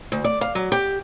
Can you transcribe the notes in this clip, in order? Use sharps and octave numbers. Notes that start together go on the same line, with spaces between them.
D2
D5
F5
F#3
G4